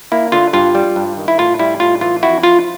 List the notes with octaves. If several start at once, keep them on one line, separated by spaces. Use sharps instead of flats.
A#3 E4
D3 F4
G2 F4
G3
G2
D#3
E4
A2 F4
G3 E4
A2 F4
E3 F4
F2 E4 F#4
F3 F4